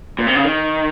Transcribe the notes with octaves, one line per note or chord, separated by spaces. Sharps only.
A#2
C3
C#3
D#3